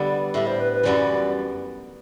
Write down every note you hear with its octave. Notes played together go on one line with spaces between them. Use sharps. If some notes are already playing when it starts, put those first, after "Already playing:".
Already playing: D3 G3 B3 D5
A2 G3 D4 E5
C5
B4
B4
F#2 E3 G3 B3 D5